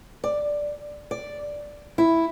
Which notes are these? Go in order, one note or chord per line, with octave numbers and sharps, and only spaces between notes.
D5
D5
E4